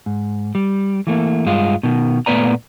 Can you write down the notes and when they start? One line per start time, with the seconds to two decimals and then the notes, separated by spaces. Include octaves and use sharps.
0.06 G#2
0.55 G3
1.07 E3 A3 A#3
1.46 G2 G#3 F4
1.83 B2 D#3
2.26 A#2 A3 B3 B4 D5 A#5